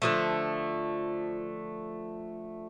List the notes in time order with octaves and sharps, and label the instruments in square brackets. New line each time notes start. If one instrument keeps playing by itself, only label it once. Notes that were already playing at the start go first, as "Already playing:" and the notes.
[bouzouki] D3 F3 A3